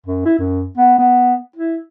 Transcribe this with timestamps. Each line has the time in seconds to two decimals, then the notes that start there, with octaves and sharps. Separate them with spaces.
0.06 F#2
0.25 E4
0.38 F#2
0.77 B3
0.99 B3
1.56 E4